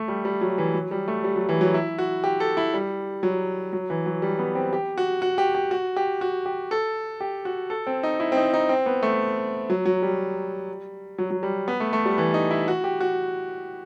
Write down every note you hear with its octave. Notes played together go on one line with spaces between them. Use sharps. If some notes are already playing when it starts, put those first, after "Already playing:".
Already playing: A3
G3
G3
F#3
E3
F#3
G3
A3
G3
F#3
E3
F#3
E4
F#4
G4
A4
E4
G3
F#3
F#3
E3
F#3
G3
B3
C4
G4
F#4
F#4
G4
G4
F#4
G4
F#4
G4
A4
G4
F#4
A4
C4
D#4
E4
C4
D#4
D#4
C4
B3
A3
F#3
F#3
G3
F#3
F#3
G3
B3
A3
A3
G3
E3
D#4
E4
F#4
G4
F#4